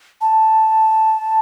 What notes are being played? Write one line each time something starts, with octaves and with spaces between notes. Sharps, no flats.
A5